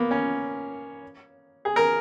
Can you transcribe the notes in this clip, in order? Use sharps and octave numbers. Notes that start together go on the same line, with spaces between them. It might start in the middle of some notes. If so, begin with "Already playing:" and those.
Already playing: A#3 B3
C#4
G#4
A#4